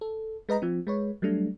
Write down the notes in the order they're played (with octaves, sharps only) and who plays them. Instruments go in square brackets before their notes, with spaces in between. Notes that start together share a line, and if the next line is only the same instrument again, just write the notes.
[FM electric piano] A4
G#3 B4 D#5 A#5
F3 C4
G#3 B4 C#5
F#3 G3 A3 D4